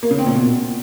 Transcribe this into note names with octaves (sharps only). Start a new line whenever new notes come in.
A#3
C#3
C4
A#2
B2